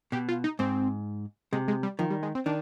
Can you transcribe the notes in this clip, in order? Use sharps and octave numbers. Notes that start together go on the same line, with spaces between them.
B2 G4
F4
D#4
G#2 C4
C3 G#3
G#3
G3
D#3 F3
G3
G#3
C4
D#3 D4